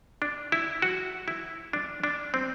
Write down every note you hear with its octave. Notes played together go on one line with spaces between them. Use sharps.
D4
E4
F#4
E4
D4
D4
C4